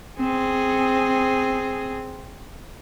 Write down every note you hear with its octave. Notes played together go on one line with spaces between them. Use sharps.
C4 G#4